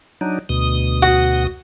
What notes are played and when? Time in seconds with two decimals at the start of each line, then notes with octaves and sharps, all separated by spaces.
0.21 F#3 D4 D#4
0.49 D2 B2 D#6
1.03 F#4